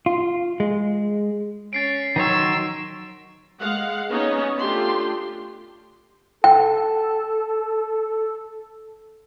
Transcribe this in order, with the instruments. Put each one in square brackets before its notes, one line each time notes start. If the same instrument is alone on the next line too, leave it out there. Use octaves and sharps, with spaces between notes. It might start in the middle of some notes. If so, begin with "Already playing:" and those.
[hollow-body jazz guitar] F4
G#3
[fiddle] C#4 [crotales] A6 C7 D7
[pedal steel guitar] D#3 F#3 C#5 [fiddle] C6 E6
[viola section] G#3 F5 F#5
B3 C#4 D#4 C#5 D#5
A3 D4 F4 G4 C6
[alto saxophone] A4 [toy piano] G5